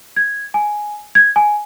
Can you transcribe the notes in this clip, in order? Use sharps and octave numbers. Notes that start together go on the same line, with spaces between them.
G#6
G#5
G#6
G#5